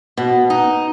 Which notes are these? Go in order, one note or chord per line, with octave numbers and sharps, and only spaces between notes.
B2
D#4